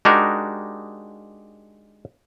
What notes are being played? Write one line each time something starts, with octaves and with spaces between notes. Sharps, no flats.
G#3 D4 D#4 F#4 G4 A#4